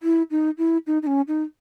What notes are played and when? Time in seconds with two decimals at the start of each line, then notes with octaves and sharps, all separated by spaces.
0.03 E4
0.31 D#4
0.58 E4
0.87 D#4
1.02 D#4
1.07 C#4
1.28 D#4